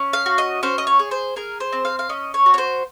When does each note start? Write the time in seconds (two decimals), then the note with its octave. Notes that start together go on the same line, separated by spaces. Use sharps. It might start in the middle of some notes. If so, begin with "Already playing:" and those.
Already playing: C#4
0.13 F5
0.26 F#4
0.38 D#5
0.63 C#4 C5
0.78 D#5
0.87 C#5
0.99 G#4
1.11 C5
1.36 G#4 A#4
1.60 C5
1.73 C4
1.85 F5
1.99 F5
2.09 C#4 D#5
2.34 C#5
2.46 F#4
2.54 C#5
2.58 C5